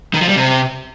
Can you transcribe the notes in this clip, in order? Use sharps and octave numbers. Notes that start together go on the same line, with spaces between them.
D#3
F3
G3
C3